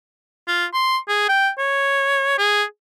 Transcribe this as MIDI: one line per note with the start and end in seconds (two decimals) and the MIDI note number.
0.48 0.65 65
0.74 0.97 84
1.08 1.25 68
1.28 1.50 79
1.58 2.34 73
2.38 2.63 68